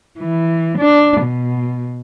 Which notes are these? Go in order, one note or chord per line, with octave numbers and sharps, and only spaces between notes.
E3
D4
B2